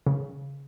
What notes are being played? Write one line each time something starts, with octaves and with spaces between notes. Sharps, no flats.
C#3